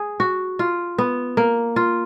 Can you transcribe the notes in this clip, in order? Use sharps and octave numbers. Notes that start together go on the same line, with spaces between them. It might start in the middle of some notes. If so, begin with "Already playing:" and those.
Already playing: G#4
F#4
F4
B3
A#3
F4